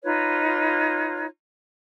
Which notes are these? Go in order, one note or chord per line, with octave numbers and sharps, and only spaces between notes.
D#4 F4 B4 C#5